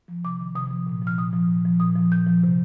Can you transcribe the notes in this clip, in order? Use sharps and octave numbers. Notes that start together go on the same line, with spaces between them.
F3
C3 D6
D#3
C3 D#6
F3
A#2
F3 F6
A#2 D#6
F3
A#2
F3
A#2 D#6
F3
A#2 G6
F3
C3